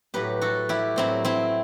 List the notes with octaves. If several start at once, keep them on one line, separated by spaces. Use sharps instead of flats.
A2 F#3 G4 B4
F#4 A4
E4 G4
A2 F#3 C4 E4
C4 E4